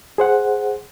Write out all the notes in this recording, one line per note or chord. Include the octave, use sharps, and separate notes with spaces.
G#4 C5 F#5